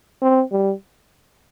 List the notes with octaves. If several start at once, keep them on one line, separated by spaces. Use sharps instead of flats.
C4
G3